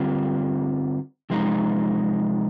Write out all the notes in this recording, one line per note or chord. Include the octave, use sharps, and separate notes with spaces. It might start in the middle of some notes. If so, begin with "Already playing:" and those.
Already playing: G2 D3 G3 C4 F4
C3 F3 G#3 D#4